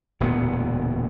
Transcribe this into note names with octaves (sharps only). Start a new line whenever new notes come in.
E1 D2 A#2 B3